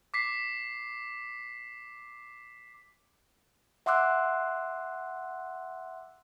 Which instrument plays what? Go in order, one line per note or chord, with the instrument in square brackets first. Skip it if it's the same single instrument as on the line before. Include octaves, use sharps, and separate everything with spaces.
[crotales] D6 B6 C7
[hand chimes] E5 F#5 C6 D6 E6 F#6